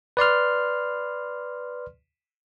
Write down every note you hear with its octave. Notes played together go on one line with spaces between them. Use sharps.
B4 D5 C6 F6